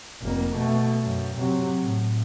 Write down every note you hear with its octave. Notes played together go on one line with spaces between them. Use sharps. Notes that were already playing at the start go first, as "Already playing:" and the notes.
F1 A#3
B2 A3
F#2
C3 F#3
A2